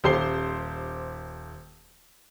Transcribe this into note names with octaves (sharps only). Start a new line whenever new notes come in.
D#1 G4 C5 C7 G7